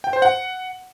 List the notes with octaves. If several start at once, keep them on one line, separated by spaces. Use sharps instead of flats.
G5
C5
F#5